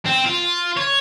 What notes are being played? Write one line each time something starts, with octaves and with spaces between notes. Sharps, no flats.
C4
F4
C#5